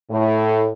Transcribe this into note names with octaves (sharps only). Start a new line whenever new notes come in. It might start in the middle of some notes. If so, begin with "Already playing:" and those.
A2